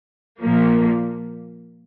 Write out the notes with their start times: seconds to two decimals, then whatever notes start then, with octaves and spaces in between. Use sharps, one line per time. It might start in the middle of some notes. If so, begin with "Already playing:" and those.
0.41 A#2 F3 A#3